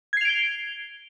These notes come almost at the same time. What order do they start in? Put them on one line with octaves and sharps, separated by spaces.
G#6 C7 F7 D7 G7